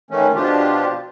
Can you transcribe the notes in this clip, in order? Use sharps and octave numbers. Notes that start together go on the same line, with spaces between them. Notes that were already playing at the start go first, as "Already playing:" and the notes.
D#3 E3 A3 C#4
B2 F3 D4 F4 G4